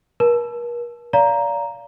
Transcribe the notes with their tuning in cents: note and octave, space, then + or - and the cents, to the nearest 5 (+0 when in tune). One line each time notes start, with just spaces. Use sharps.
A#4 +40 A5 -25
D5 -35 F5 +0 A#5 +0